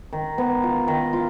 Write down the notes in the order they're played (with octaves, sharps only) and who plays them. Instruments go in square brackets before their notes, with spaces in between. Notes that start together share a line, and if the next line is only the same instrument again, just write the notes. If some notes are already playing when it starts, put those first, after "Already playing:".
[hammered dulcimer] D#3
B3
F4
D#3
F4